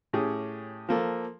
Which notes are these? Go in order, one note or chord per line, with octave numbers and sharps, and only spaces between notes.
A2 C#4 G4 G#4
F3 A#3 A4